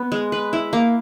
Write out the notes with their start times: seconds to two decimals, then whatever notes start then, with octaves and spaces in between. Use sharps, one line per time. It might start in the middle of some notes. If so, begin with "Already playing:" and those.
Already playing: B3
0.12 G#3
0.32 B4
0.53 E4
0.73 A#3